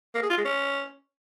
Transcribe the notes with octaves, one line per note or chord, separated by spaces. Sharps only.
A#3
G#4
F4
G#3
C#4